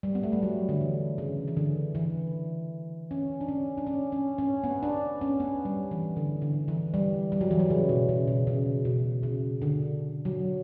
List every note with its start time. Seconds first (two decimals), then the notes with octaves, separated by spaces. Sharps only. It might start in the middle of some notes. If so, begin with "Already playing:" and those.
0.03 G3
0.15 B3
0.23 A3
0.33 G3
0.42 F#3
0.69 D3
0.81 E3
1.18 C#3
1.47 E3
1.57 D3
1.95 E3
3.11 C#4
3.41 D4
3.48 C#4
3.78 D4
3.87 C#4
4.12 C#4
4.38 C#4
4.64 B3
4.83 D4
5.21 C#4
5.40 B3
5.65 G3
5.91 E3
6.17 D3
6.42 D3
6.68 E3
6.94 G3
7.32 G3
7.41 F#3
7.51 E3
7.59 F#3
7.70 C#3
7.89 B2
8.09 C#3
8.27 B2
8.47 C#3
8.85 B2
9.23 C#3
9.62 D3
10.25 F#3